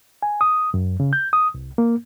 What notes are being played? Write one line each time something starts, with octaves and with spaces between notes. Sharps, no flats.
G#5
D#6
F#2
C#3
G6
D#6
C2
A#3